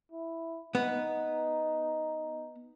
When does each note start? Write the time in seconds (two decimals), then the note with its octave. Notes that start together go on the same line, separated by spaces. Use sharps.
0.12 E4
0.75 B3 D#4